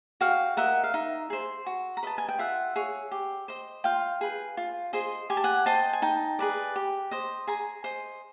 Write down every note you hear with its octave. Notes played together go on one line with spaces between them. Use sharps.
F#4 F5 G5
A#4 D#5 E5 F#5
F5
D#4 E5
G#4 C5
F#4
A#5
B4 D#5 A5
G#5
G5
F4 E5 F#5
G#4 C#5
G4
C5 D#5
F4 F5 G5
G#4 B4
F4
G#4 C5 D#5
G4 G#5
A5
F#5 G#5
C5 D#5 G5 A5
G#5
D#4 G5 A5
G#4 B4 D5
G4
C5 D#5
G#4 G#5 A#5
C5 D#5